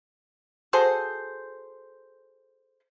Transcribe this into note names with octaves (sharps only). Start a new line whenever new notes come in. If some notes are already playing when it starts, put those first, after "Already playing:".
F#4 G#4 A4 C5